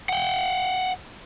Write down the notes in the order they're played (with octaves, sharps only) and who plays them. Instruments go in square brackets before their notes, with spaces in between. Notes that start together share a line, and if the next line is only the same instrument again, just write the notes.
[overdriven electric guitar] F#5 G5